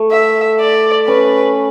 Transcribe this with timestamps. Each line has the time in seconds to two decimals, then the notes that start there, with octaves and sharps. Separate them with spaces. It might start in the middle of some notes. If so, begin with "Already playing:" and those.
Already playing: A3
0.11 E5
0.60 D5
1.07 C#4 B4